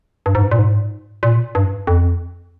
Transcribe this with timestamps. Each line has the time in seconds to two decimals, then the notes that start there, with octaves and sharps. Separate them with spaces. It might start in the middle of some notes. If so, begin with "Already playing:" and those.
0.26 G2
0.35 G#2
0.43 G2
0.51 A#2
0.59 G#2
1.23 A#2
1.55 G2
1.87 F2